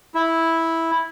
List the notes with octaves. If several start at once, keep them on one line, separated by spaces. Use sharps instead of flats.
E4